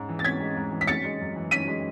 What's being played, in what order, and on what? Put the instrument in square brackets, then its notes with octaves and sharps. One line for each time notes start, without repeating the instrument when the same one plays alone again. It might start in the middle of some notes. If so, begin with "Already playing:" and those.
Already playing: [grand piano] G#2 G#3 C#4
E3
[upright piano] A6
[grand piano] C#4 [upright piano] G#6 B6
[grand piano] G#3
G#2
E3
[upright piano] B6
[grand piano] C#4 [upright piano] A6 C#7
[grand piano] G#3
F#2
E3
[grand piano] C#4 [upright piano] B6 D#7
[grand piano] G#3